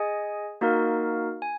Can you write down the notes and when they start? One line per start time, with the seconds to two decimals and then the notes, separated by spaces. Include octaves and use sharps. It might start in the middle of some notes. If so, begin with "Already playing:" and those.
Already playing: G#4 D#5 G#5
0.61 A#3 D#4 F#4 A#4 F5
1.42 G#5